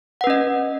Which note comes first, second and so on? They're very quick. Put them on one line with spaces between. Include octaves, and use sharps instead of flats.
F#5 B4 C#4 D#5